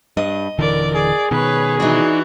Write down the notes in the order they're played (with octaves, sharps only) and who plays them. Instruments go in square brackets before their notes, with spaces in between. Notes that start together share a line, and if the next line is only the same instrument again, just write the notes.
[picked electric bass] G2 [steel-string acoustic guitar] D#5
[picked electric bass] D#1 D3 E3 [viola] A#4 D5
[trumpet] G#4 [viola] D5
[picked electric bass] B2 D#3 [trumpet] G#4 [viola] B4 C#5
[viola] E3 F#4 [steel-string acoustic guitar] D4 D#4